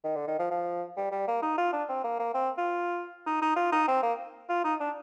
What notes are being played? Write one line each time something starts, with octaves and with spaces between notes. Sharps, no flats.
D#3
D3
D#3
F3
F3
G3
G3
A#3
D#4
F4
D4
C4
A#3
A#3
C4
F4
D#4
D#4
F4
D#4
C4
A#3
F4
D#4
D4